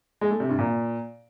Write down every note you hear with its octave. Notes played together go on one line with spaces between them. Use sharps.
G#3
A3
C3
G2
A#2